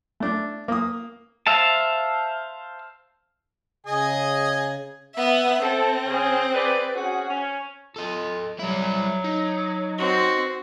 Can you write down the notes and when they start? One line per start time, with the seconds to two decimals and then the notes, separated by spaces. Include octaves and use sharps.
0.20 A3 D4
0.68 A#3 D#6
1.47 C5 E5 F5 A5
3.86 C#3 G#4 D#5 G#5
5.15 B3 E5
5.62 C4 A4
6.06 C#3 C#4 G#4
6.53 G#4 B4 D5
6.95 C#4 F#4 G#4
7.29 C#4
7.96 F4 A4 D#5
8.60 F#3 G3 E4
9.24 D#4
9.98 C4 F#4